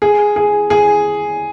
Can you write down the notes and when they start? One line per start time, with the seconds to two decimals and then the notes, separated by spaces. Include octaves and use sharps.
0.02 G#4
0.36 G#4
0.70 G#4